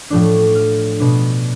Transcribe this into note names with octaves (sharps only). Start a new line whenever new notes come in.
A2 F3 A3 D4
F6
B2 B3 D4